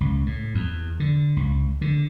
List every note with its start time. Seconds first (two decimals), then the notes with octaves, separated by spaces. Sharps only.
0.01 C#2
0.26 A2
0.55 E2
1.00 D3
1.37 C#2
1.81 D3